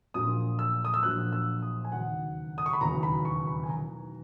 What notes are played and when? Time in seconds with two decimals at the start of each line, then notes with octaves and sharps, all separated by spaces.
0.14 A#1 A#2 F#3 D#6
0.59 E6
0.85 D#6
0.94 E6
1.03 A#1 A#2 F#3 F#6
1.32 E6
1.62 D#6
1.85 G#5
1.92 E1 D#2 C#3 F#3 F#5
2.58 D#6
2.66 C#6
2.73 B5
2.81 E1 D#2 C#3 F#3 A#5
3.03 B5
3.25 C#6
3.47 B5
3.63 G#5
3.69 E1 E2 D#3 F#3 A#5